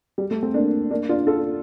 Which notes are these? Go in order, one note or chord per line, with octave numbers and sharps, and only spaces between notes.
G3
A3
A3 C4
A#3 D4
A#3 D4
D4 F4
F4 A4